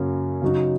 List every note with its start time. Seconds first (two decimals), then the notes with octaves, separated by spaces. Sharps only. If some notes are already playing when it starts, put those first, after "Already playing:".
Already playing: F#2 C#3 A#3 C#4 F#4
0.42 C#3 F#3 D#4 F#4